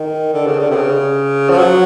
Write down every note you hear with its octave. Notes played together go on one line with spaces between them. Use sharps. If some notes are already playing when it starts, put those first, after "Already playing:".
Already playing: D#3
D3
C#3
D3
C3
C#3
F3
F#3